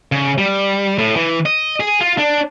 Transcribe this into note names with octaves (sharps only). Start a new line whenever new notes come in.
C#3
G3
A2
E3
D#5
G#4
F4
D4